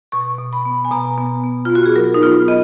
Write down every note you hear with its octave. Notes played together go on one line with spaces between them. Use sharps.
B2 C#6
B2
B5
B3
G#5
B2 A#5
B3
B3
B3 F4
F#4
G#4
F#3 A#4
D#4
B3 F4
B3 D#5